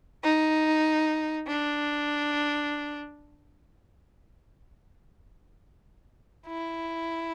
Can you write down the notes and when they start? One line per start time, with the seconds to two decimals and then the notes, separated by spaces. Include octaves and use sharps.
0.24 D#4
1.48 D4
6.47 E4